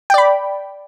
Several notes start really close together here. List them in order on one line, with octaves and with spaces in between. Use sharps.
G5 D5 B5